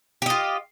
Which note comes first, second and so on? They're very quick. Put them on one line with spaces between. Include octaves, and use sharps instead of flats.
G4 D#5 F4